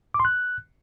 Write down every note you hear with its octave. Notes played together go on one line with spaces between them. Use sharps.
D6
C6
F#6